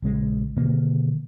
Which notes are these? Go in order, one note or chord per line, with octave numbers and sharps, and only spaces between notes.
A#1 C#3 G#3
B2 D3 D#3 A#3